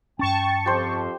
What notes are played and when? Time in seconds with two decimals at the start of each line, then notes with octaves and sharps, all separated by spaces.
0.19 G2 C#4 G5 A5 C#6
0.66 F2 G4 C5